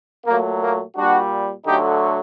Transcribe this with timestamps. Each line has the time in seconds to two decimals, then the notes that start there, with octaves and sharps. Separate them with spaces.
0.26 A#2 F#3 A3 A#3
0.61 A#3
0.95 A#2 G3 D4 F#4
1.66 D3 F#3 A3 D#4 G4